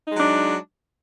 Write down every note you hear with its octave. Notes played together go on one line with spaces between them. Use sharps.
F#3 G#3 D4 D#4